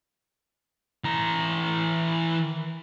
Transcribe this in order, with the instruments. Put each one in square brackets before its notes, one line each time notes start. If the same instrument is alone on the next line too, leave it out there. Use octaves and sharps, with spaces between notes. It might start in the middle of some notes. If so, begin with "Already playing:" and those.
[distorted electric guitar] E3 A#5